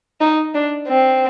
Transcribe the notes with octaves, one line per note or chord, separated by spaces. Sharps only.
D#4
D4
C4